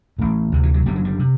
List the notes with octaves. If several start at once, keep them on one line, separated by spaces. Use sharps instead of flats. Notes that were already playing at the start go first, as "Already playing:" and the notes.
A1 A2
D2 C3
E3
F#3
F#1 F#2 D3 G3
F#3
G3
C3